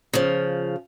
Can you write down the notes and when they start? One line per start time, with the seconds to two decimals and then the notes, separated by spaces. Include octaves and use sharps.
0.13 C#3 F3